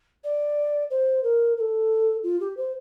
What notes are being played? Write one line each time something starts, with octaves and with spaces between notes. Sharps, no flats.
D5
C5
A#4
A#4
A4
F4
G4
C5